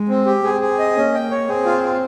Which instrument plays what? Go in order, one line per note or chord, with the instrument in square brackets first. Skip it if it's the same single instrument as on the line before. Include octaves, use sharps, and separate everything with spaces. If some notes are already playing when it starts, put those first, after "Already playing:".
Already playing: [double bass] G#3
[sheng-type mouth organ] C4
G4
[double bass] C4 [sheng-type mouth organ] G#4
[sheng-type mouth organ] G#4
D#5
[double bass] A#3 [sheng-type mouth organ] C#4
[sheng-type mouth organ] G5
C#5
[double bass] C4 [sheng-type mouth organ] G#4
[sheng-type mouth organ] F4
F4